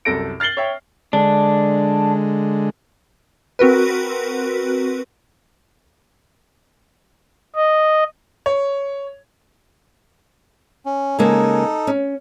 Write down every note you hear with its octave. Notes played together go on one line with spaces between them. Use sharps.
C2 F#2 A4 A#6 D7
F6 A6 C7 F#7 G7
C#5 E5 G5
D3 G#3 D4
C4 F#4 A#4 B4
D#5
C#5
C#4
C#3 G#3 A#3 D#4 A4
C#4